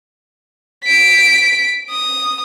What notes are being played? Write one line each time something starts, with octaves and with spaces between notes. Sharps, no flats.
B6 D7
D#6